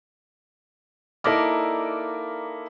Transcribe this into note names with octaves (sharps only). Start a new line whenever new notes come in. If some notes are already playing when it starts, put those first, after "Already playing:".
A#3 D#4 E4 A4 A#4 D5